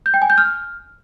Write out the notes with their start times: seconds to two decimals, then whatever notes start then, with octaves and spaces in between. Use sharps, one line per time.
0.06 G6
0.14 G5
0.22 G#5
0.30 G6
0.38 F6